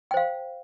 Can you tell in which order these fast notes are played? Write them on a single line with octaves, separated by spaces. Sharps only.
G5 C5 F5